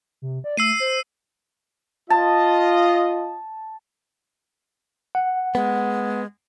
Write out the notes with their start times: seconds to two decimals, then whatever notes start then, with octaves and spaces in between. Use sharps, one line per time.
0.22 C3
0.44 D5
0.57 A3 E6 C7 D#7
0.80 C5
2.10 F4 D#5 A5
5.15 F#5
5.55 G#3 B3